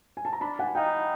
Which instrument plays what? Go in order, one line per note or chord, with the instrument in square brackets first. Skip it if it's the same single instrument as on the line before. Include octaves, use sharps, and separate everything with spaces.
[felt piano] G#5
A5
A#5
[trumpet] D4 [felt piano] A5 B5
[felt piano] F#5 G#5
[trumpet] D#4 [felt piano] F5 G5